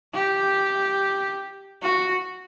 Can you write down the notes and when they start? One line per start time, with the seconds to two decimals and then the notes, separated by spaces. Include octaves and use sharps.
0.15 G4
1.83 F#4